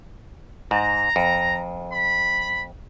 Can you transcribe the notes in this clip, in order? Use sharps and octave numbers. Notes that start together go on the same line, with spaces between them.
G#2 A#5
F2
B5